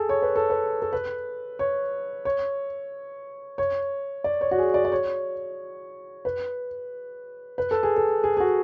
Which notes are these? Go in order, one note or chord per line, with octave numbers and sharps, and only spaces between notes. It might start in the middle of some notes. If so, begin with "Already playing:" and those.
Already playing: G#4 A4
C#5
B4
A4
B4
A4
B4
C#5
C#5
C#5
D5
C#5
F#4
G#4
D5
D5
C#5
B4
B4
A4
G#4
A4
G#4
G#4
F#4